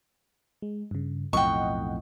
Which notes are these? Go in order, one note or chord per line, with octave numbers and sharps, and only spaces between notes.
G#3
G2 C#3
B1 F2 A2 D#5 F#5 G5 C#6